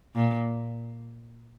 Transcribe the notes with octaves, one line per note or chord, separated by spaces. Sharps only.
A#2